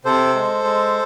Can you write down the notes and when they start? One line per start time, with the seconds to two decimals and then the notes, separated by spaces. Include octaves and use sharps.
0.05 C3 A4 C5
0.35 G#3
0.64 G#3